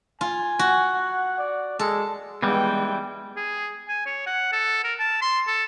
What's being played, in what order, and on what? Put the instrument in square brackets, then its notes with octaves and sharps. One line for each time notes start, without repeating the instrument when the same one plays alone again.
[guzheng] F4 [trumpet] G#5
[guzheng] F#4
[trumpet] F#5
D5
[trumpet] G#3 [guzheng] A4
[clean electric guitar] E3 G3 [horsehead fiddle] G#3 G5 [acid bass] B3
[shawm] G#4
G#5
C#5
F#5
A4
A#4
A5
C6
A4